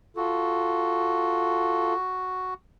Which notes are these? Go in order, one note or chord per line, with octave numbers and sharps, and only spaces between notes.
F4 F#4 A4